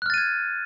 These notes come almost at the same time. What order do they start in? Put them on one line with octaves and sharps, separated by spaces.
F#6 F6 A6 D#7 G#6